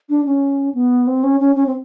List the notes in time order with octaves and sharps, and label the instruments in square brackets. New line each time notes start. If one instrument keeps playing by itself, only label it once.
[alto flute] D4
C#4
B3
C4
C#4
C#4
C#4
C4